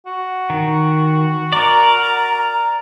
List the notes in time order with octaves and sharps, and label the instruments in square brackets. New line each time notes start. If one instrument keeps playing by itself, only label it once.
[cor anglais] F#4
[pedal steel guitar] D#3
[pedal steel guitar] A#4 D5 [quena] A#5